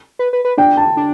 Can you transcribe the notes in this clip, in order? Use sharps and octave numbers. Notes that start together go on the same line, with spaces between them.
B4
B4
B4
D4 G5
A5
D4